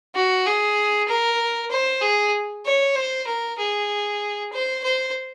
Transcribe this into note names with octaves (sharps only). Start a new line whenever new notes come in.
F#4
G#4
A#4
C5
G#4
C#5
C5
A#4
G#4
C5
C5